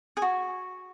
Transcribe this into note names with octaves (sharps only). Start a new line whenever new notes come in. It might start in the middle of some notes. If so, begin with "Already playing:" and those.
G#4
F#4